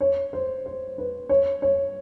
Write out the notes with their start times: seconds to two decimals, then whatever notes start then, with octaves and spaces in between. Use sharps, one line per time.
0.01 C#5
0.33 C5
0.66 C5
0.98 B4
1.29 C#5
1.62 C#5